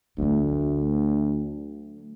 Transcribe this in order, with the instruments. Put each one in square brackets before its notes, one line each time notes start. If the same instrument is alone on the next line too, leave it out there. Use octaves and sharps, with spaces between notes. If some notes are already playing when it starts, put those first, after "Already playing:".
[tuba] D2 [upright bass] F#3 A3